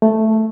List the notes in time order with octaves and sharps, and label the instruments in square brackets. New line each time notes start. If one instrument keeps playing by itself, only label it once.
[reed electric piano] A3